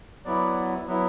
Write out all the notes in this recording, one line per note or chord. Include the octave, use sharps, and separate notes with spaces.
F#3 B3 E4 D5
F#3 B3 E4